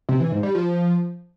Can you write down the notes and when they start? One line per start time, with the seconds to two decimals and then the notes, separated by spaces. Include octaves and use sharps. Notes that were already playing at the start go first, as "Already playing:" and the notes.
0.09 C3
0.20 E3
0.32 G#2
0.43 G3
0.55 F3